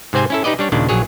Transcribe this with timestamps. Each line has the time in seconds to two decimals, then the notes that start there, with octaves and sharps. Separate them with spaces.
0.13 G#2 C3 C4 C5 G#5
0.30 C#4 E4 A4
0.44 D#4 G4 B4 D5 D#5
0.59 G3 D4 C#5
0.72 D#2 A#2 C#3 D4
0.89 A#1 F#3 G#4 C#5